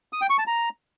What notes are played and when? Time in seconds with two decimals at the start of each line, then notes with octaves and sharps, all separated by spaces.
0.13 D#6
0.21 G5
0.30 C#6
0.38 A5
0.47 A#5